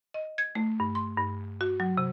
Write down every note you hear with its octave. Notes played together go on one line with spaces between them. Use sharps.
D#5
G#6
A3
G2
C6
G2
F#4
F#3
C3